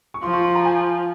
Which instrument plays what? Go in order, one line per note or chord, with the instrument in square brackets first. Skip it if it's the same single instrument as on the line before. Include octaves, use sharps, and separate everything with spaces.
[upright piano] C#6
[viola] F3 [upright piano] C6
[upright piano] C#6
C6
A#5
G#5